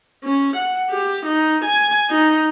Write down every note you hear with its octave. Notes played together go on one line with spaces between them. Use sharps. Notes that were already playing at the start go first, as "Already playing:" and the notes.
C#4
F#5
G4
D#4
G#5
D#4